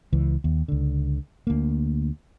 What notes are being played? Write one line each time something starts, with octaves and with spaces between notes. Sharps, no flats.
C#2 E3
D#2
C#2 D3
D2 A#3